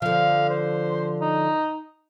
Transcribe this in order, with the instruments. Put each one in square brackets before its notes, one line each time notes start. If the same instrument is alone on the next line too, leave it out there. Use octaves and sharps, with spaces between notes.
[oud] D3 F3 [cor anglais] F5
[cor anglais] C5
D#4